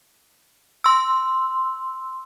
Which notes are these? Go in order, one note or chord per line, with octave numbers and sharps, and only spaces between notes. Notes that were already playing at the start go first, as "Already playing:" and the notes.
C6 E6